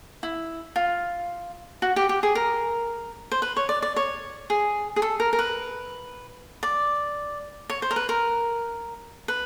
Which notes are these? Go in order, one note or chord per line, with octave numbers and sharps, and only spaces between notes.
E4
F4
F#4
G4
G4
G#4
A#4
C5
B4
C#5
D5
D5
C#5
G#4
G#4
A4
A#4
A#4
B4
D5
C#5
C5
A#4
B4
A#4
B4